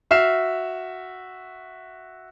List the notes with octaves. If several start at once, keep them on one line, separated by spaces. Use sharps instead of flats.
F#4 E5 F6 C7 E7